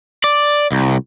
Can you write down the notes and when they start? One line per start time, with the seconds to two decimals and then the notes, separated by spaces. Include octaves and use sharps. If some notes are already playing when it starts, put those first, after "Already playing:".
0.24 D5
0.72 C2